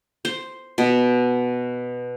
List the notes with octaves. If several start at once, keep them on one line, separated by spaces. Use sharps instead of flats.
C5
B2